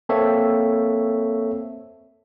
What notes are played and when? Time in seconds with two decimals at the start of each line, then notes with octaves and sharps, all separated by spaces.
0.09 A#3 C4 A4 C#5 E5